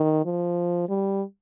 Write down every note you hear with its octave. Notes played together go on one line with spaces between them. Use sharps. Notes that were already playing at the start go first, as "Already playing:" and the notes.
Already playing: D#3
F3
G3